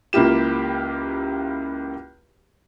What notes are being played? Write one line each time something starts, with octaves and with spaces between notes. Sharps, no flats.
C#2 A#3 E4 F4 G4 E7